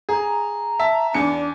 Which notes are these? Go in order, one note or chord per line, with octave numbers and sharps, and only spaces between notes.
G#4 A#5
E5 A5
E2 D4 C#7